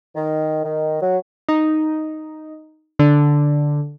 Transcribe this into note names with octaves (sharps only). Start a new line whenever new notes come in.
D#3
D#3
F#3
D#4
D3